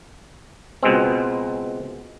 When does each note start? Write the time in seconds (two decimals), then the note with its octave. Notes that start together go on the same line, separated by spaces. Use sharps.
0.83 C#2 B2 G#3 C4